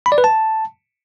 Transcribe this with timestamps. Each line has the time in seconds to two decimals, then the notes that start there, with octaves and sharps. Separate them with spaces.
0.06 B5
0.12 D5
0.18 B4
0.24 A5